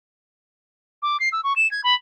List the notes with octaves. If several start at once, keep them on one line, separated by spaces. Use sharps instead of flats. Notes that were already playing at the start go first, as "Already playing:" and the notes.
D6
C7
E6
C#6
E7
G#6
B5